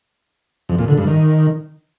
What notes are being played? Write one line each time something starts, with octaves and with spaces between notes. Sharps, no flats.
F2
A#2
D3
G2
D#3